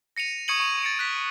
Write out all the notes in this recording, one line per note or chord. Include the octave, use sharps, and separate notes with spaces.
A#6 C#7 D#7 F7
C#6 D#6 G#6 C#7 D#7 F#7
C#6 D#7 F7
A6 C#7 D7
F#6 B6